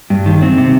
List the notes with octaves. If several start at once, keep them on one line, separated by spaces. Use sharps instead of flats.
G2
D#3
C4
C3